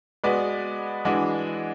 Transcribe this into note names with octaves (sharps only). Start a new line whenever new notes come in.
G#3 B3 F#4 B4 D5
E3 G#3 D4 F#4